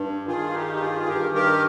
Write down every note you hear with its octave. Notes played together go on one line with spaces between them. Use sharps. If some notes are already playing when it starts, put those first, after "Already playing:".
Already playing: G2
G2 D#3 F4 G#4
D#4 G4
G4
F4 G#4
G2 D#3 G4 A#4
G4 A#4